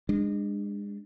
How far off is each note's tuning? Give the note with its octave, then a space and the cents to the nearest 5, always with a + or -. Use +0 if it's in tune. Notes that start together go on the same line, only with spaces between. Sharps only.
G#3 -30 D4 +20